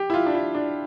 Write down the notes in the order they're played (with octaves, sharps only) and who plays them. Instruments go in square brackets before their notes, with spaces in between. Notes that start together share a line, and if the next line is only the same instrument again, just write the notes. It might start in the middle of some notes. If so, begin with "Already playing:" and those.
Already playing: [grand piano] G4
E4
F4
D4
E4
D4